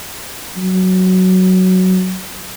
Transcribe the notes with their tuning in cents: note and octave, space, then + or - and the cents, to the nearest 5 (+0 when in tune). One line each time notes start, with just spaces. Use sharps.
F#3 +5